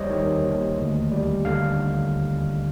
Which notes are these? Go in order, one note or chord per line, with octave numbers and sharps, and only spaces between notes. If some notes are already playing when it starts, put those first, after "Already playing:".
Already playing: D#2 G3 C5 C#5 D#5
D#3
D#2
D2
G3
D3 F5